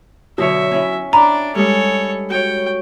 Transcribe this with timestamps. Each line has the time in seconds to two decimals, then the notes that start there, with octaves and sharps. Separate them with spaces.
0.38 B2 D3 F#3 C#5 E5
0.71 C#4 E4
1.13 D4 D5 A#5 B5
1.55 G3 G#3 A4 C#5
2.30 F#4 C#5 G5